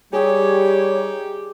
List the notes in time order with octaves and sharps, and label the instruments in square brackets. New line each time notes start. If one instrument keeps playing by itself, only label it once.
[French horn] G3 [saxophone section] D#4 G4 [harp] G#4 D#6 [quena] C#5